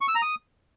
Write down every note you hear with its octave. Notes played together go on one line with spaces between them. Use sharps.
C#6
E6
A#5
D#6